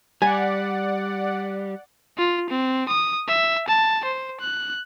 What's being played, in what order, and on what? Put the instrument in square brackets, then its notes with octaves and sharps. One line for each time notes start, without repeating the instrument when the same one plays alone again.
[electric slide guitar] G3 [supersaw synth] D5 F#5 [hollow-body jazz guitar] G#5
[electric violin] F4
C4
D#6
E5
A5
C5
F#6